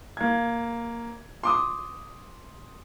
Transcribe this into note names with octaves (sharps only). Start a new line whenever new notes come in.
A#3 G#6
C6 D6 D#6